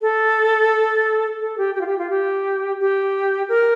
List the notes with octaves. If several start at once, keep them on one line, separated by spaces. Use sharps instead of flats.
A4
A4
G4
G4
F4
G4
F4
G4
G4
A#4